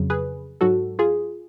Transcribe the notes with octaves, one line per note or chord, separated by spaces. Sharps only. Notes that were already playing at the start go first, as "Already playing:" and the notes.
Already playing: F2 C#3 F#3
G#4 B4
G#2 F#3 F#4 A4
F4 G#4